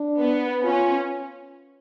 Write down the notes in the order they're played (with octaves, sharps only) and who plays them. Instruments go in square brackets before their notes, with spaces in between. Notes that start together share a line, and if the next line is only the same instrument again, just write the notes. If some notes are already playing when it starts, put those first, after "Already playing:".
Already playing: [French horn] D4
[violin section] B3
[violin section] C#4 [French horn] F4